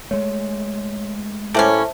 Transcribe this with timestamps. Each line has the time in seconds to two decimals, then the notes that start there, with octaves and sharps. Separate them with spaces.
0.11 G#3 A3 C#5
1.54 A2 G3 A#3 C#4 C5 E5 A5